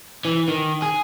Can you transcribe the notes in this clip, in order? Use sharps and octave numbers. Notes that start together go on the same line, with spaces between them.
E3
D#3
G#4